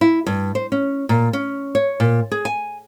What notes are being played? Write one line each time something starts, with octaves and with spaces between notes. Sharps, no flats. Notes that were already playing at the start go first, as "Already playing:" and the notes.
E4
G2
C5
C#4
A#2
C#4
C#5
A#2
G#4
G#5